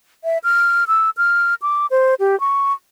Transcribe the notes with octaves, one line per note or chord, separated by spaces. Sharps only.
E5
F6
E6
F6
D6
C5
G4
C#6